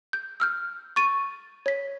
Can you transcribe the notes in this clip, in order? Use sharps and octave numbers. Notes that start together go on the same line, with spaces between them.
G6
E6 F6 G6
C#6 A6 D#7
C#5 B6